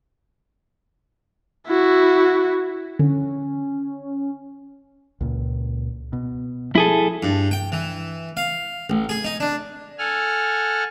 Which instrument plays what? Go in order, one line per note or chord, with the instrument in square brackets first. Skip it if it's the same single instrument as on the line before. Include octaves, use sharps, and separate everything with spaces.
[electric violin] E4 F#4
[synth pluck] D3 [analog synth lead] C#4
[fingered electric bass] C#2 A#2
B2
[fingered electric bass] F3 [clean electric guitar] E4 G#4 A4
[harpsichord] G2
G5
E3
F5
A1
G#4
D#4
D4
[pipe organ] A4 F#5 G#5 F6